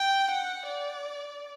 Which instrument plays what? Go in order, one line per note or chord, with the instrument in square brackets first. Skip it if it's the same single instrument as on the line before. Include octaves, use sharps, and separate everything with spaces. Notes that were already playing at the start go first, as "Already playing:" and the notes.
Already playing: [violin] G5
F#5
D5